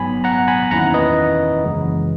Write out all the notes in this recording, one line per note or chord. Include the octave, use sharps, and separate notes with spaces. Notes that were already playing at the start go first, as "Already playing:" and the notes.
Already playing: G#1 G#2 F#3 B3 G#5 B5
F#5 A#5
G#5 B5
E2 D#3 A#3 C#4 E4 F#5 A#5
B4 D#5
F#2 C#3 E3 G#3